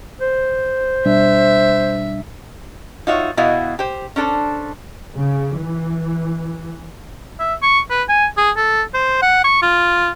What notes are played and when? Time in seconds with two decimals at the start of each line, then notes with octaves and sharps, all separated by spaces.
0.21 C5
1.05 B2 G3 D4 E5
3.07 D#4 F4 F#4 C#5 E5
3.37 B2 B3 E4 F#4 D#5 F5
3.79 G4 C5
4.16 C#4 D4 A4 C5
5.15 C#3
5.56 E3
7.39 E5
7.62 C#6
7.90 B4
8.09 G#5
8.37 G#4
8.57 A4
8.94 C5
9.22 F#5
9.44 C#6
9.62 F4